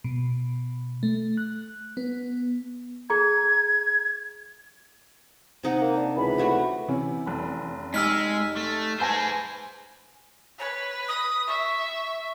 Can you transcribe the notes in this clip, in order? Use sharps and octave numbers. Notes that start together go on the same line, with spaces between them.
B2
A3
F#6
B3
G#4 A#5 G#6
C3 D#4 F#5
A#3
D4
C#2 E3 B5
A3 F#4 G4
C3 E3 C#4
F1 B5
G#3 D#4 G4 G#5 E6 F6 B6
A3
G#4 B4 C5 G#5 A5 G6 A#6
B4 C#5
D#6
E5 C#6